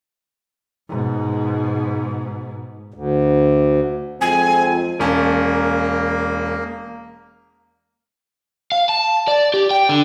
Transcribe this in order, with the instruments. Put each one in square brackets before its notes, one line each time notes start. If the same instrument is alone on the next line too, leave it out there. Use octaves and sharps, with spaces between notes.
[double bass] G#2 B2
[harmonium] D2
[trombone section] F2 G#3 C4 [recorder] G#5
[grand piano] E1 C#4 A5 [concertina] A#3
[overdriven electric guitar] F5
A5
D5
G4
G5
D3